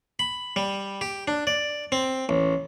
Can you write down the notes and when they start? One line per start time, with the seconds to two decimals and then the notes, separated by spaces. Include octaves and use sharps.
0.19 B5
0.56 G3
1.01 G4
1.28 D4
1.47 D5
1.92 C4
2.29 A1